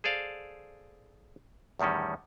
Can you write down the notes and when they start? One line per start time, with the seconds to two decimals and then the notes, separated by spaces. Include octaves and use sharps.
0.04 G#4 A4 C5 D5 F5
1.79 E2 A2 D#3 G3 C#4